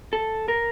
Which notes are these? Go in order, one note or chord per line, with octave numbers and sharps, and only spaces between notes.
A4
A#4